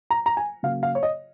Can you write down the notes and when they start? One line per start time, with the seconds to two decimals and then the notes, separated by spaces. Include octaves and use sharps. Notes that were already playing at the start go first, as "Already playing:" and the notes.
0.10 A#5
0.26 A#5
0.37 G#5
0.63 C#3 F#3 A#3 F5
0.83 F5
0.95 C#5
1.03 D#5